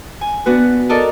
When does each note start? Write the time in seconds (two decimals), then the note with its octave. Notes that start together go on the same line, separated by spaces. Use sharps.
0.21 G#5
0.46 B3 D4 F#4 B4
0.89 A4 A#4 D5 D#5 A5